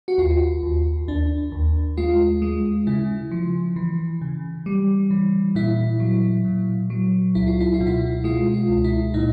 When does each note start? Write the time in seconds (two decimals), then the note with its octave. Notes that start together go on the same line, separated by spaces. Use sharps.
0.08 F#4
0.18 D#2 F4
0.63 D#2
1.08 D#2 D4
1.52 D#2
1.97 G#3 F4
2.42 G#3
2.87 C#3 E4
3.31 F3
3.76 E3
4.21 C#3
4.66 G3
5.11 E3
5.55 A#2 E4
6.00 F#3
6.45 A#2
6.90 F#3
7.35 C#2 E4
7.47 F4
7.61 E4
7.74 F4
7.80 B2
7.87 E4
8.24 G#3 F4
8.54 F4
8.69 C#2
8.84 E4
9.14 A#2 D#4